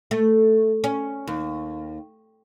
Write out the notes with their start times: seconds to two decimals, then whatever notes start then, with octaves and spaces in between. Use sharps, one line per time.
0.11 A3
0.84 C#4
1.27 D#2